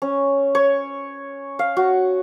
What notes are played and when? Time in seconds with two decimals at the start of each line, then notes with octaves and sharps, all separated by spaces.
0.02 C#4
0.55 C#5
1.59 F5
1.77 F#4